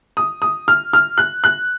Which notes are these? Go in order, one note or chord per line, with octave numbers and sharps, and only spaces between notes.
D#6
D#6
F6
F6
F#6
F#6